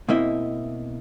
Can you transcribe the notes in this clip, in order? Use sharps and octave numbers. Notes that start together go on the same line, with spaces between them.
B2 A#3 C4 E4 D#5 E5